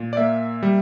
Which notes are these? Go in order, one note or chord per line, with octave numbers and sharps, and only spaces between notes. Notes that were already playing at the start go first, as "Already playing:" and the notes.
Already playing: A#2
D5
A#3 E5
G3